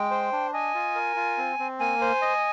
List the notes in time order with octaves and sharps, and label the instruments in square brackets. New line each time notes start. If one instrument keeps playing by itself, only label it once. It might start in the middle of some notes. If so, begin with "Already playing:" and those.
Already playing: [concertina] G#3 [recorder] G5
[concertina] C5
D4
[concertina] D#5 [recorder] G#5
[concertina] F4
A#4
F4
C4
C4
[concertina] A#3 [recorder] G#5
[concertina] C5
D#5